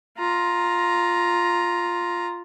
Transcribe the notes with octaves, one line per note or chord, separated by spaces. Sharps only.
F4 A#5